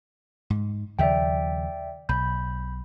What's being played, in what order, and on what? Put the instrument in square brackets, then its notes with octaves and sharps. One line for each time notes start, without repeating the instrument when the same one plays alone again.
[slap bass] G#2
[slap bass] D#2 C#3 F3 [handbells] D5 E5 G5
[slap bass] B1 [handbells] B5 G6